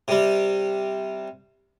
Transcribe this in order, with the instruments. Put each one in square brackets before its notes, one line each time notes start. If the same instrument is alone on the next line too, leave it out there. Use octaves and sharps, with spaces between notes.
[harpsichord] C3 G3